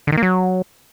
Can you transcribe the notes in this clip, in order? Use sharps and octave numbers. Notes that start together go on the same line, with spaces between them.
D3
D#3
A#3
F#3